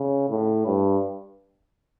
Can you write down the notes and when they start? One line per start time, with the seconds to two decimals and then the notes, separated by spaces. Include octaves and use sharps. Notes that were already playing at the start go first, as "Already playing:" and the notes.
Already playing: C#3
0.30 A2
0.66 G2